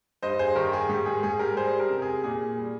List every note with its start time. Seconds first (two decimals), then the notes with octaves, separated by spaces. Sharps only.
0.23 G2 C5 D#5
0.39 G#4 C5
0.56 D#3 G4 A#4
0.73 G#4
0.89 G#2 G4
1.06 G#4
1.23 G#2 G#4
1.39 G4 A#4
1.56 G3 G#4 C5
1.79 G4 A#4
1.90 C3
2.02 G#4
2.24 A#2 G#4
2.58 G3